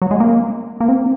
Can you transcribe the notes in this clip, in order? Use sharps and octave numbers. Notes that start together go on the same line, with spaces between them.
F#3
G#3
A#3
A#3
C4